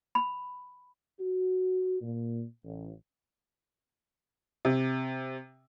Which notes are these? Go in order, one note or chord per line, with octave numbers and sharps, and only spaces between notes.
B5
F#4
A#2
A1
C3